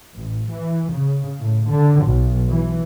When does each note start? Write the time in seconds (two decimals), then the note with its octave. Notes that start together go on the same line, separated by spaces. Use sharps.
0.15 A1
0.52 E3
0.93 C#3
1.40 A2
1.71 D3
2.05 B1
2.51 E3